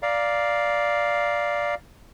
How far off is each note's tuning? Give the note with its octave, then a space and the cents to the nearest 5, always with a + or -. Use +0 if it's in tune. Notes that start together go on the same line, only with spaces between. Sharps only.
D5 +0 F5 +0 A#5 +20